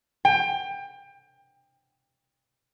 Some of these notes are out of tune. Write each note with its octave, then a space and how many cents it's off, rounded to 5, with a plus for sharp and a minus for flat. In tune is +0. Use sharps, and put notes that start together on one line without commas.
G5 +25